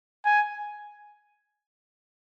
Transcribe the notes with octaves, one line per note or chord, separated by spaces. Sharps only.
G#5